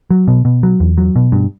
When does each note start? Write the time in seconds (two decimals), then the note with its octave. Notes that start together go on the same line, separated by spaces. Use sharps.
0.10 F#3
0.28 B2
0.45 B2
0.63 F#3
0.80 E2
0.98 F#3
1.16 B2
1.32 G2